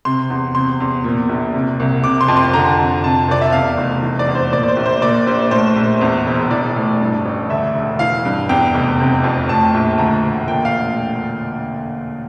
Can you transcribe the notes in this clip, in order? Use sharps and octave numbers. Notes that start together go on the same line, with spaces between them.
C3 C6
E2
C3 C6
E2
A#2
A#1
C3
C2
C3 D6
C6
F2
C6
D3 A#5
F2
C3 A5
C2 D5
E5
E2 F5
F1
E3
D5
E2
C5
A#2 D5
D5
C5
A#1
C5
A#2 D5
A#1 C5
A2 C5
A#1
E2
E1
E3 D5
A2
G2
A1
D2 E5
E1
E3 F5
G2
E2 G5
F1
C3
F2
A2 A5
A#1
D2 A#5
E1
A#2 G5
F5